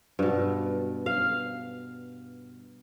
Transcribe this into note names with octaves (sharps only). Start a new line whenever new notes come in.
G2 B2
F5